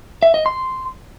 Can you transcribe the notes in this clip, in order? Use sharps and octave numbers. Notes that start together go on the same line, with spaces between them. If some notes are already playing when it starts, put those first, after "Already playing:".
E5
D#5
C6